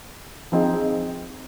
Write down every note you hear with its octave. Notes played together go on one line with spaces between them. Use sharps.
F3 C4 D#4 G#4